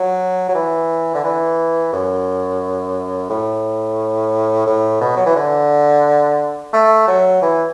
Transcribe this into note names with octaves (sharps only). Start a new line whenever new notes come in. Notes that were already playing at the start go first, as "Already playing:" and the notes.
Already playing: F#3
F#3
E3
D3
E3
F#2
A2
A2
B2
F#3
E3
D3
A3
F#3
E3